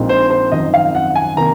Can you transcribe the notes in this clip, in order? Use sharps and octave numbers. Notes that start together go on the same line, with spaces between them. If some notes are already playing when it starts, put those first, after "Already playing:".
Already playing: A#1 A#2 G#3 C4 D#4
C5
C5
G#1 F#2 F3 C4 D#4 D#5
F5
F#5
G#5
C3 D#3 A#3 A#5